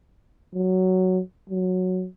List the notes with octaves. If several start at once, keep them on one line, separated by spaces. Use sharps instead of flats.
F#3
F#3